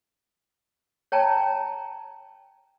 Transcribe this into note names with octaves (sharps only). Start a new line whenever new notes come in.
C#5 G5 A5 A#5